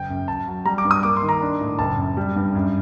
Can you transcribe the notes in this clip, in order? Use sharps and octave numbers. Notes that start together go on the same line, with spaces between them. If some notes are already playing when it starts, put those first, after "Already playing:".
Already playing: F#1 G5
F#2
F#2 A5
F#3
G3 A#5
D6
G2
D#6
A#3 D6
C6
D#3
A#5
D4
A2
F#1 A5
F#2
G3
G2
F#2